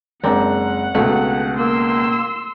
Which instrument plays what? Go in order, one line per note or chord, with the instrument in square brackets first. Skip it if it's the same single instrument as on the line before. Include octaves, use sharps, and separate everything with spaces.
[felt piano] F#1 G#3 A#5 [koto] C4 D4 [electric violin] F#5
[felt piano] C#2 B2 [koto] A3
[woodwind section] A#3 [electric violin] C6 E6